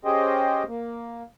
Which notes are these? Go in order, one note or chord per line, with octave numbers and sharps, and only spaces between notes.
C#4 G4 G#4 C5 D#5 G5
A#3